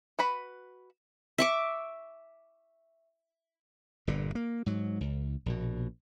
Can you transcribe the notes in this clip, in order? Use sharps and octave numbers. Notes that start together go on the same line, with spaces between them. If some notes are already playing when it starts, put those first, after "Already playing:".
F#4 B4 B5
E5 C#6 D6
G1 A#2 D3
A#3
G#2 F#3
C#2
A#1 B2